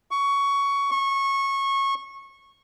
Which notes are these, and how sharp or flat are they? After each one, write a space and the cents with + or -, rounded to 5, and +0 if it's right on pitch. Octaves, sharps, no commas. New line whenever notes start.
C#6 +15
C#6 -20